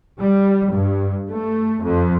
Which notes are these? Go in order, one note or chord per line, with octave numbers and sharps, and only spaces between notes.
G3
G2
A3
F2